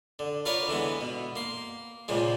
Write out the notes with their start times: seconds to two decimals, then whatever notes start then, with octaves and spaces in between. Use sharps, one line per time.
0.19 D3
0.46 F4 A#4 B4 C#5 D5
0.68 D3 E3 G#3 B3
1.01 B2
1.36 A#3 C6
2.08 C#2 A#2 C#3 F3 G#3